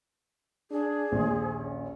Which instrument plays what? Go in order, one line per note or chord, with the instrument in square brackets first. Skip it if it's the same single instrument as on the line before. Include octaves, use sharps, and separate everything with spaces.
[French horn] D4 [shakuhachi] G#4
[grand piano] A#1 D#2 [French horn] C5
[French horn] C#4